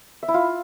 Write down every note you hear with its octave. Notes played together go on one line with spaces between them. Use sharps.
E5
E4
F4